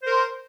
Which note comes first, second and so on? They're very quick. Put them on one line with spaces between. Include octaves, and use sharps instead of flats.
C5 A#4 C6